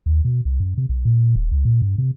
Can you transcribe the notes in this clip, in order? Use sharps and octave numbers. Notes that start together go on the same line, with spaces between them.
D#2
B2
C2
F#2
C3
B1
A#2
D#1
C#2
A#2
G2
C3